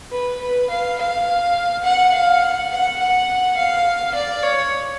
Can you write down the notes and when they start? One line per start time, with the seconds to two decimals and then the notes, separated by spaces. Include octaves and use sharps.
0.12 B4
0.41 B4
0.70 F5
0.99 F5
1.84 F#5
2.14 F5
2.42 F#5
2.71 F#5
2.99 F#5
3.57 F5
4.14 D5
4.43 C#5